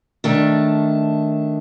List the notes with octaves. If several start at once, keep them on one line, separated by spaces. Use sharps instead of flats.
D#3 A3 D4